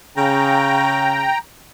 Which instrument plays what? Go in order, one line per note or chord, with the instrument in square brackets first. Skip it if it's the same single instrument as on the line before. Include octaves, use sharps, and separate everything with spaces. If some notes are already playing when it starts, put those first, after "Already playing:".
[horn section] C#3 [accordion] G5 A#5